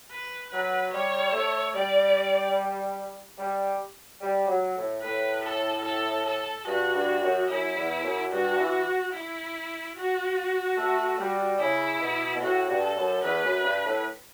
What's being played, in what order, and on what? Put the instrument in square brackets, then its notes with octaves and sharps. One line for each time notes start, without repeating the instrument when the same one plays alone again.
[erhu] B4
[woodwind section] F#3 [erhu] B4
[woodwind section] G3 [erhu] C#5
[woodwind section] A3
[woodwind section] G3 [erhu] D5
[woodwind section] G3
G3
F#3
A2
[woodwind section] A2 [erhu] B4
[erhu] A4
A4
A4
[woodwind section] G2 [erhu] F#4
[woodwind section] G2
F#2
[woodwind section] F#2 [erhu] E4
[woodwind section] E2
F#2
[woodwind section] G2 [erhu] F#4
[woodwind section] E3
[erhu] E4
F#4
[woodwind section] A3
G3
[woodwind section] C#3 [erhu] E4
[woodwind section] B2
B2
[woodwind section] A2 [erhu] F#4
[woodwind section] G2
[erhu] A4
[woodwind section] F#2
[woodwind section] E2 [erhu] B4
[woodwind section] F#2
G2
A2